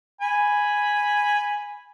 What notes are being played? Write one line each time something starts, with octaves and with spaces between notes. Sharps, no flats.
G#5 B5